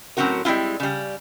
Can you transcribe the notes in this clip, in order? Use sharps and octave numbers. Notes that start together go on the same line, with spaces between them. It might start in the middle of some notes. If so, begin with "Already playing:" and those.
A2 F#3 C4 C#4 F#4 A#4
G3 G#3 C4 E4 F4
C#3 G3